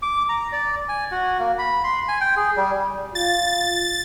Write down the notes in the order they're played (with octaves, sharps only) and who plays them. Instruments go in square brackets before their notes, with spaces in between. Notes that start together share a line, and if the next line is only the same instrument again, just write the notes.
[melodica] D6
A#5
D5
G#5
F#4
A#3
B5
C6
G#5
G5
G#4
G3
[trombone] F4 [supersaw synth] A6